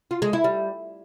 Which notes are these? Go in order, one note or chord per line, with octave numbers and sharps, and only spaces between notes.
F4
G#3
E4
G3